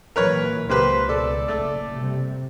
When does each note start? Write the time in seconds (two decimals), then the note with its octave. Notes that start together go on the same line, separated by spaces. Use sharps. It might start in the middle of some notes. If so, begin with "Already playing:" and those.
0.16 A#2 E3 F#3 A#4 B4 C#5
0.69 C#2 B2 A#3 G4 B4 C5
1.09 A4 D5
1.48 F#1 B1 A3
1.92 C3 G3